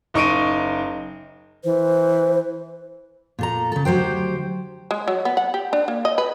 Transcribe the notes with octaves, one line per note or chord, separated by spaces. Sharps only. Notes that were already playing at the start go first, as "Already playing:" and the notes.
F#1 D#4 C#6 D7 D#7
E3 C5
A#2 A4 A#5
C#3 A4
D2 F#3 G4 C5 G5
G#3
F#3
B3
F#5
G4
D4
A#3
D#5
B4